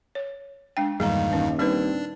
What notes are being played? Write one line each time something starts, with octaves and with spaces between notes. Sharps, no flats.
C#5
G#3 D4 G5
E2 G2 A#2 D#3 G3 G#3 F5 A#5
D#1 D#2 C#4
G3 C4 D4 D#4 B4